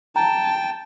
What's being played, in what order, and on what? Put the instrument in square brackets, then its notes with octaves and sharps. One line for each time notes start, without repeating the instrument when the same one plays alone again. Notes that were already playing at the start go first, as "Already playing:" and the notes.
[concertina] G5 [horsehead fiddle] A5 [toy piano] A#5